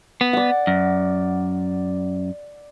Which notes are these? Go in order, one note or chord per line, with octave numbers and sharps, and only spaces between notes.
B3
D5 F#5
F#2